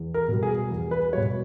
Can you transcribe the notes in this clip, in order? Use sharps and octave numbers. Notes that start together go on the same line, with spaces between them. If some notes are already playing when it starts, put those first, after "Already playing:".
Already playing: E2
A#4
B2 G3
G#4
E2
B4
B2 G3 C#5